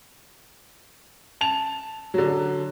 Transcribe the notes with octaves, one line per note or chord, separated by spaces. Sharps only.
A5 F7
D3 F#3